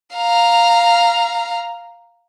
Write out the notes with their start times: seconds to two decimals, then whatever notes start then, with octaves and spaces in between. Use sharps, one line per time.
0.15 F5 A#5